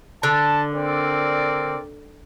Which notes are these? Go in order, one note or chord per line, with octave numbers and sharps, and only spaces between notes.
D3 A5
C4 A#4 D5